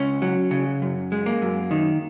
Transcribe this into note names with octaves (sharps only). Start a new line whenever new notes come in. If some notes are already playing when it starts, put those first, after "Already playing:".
Already playing: C#2 C#4
F#3
C#3
F#2
G#3
A#3
F#2
D#3